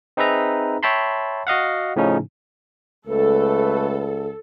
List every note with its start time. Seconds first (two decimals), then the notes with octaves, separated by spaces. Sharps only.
0.17 C4 D#4 G#4 B4 E5 A#5
0.83 C#5 E5 G5 A5 B5 C6
1.47 F#4 D#5 F5 F#5
1.96 A2 C#3 F3 C#4 D#4
3.07 C#2 A3 A4 B4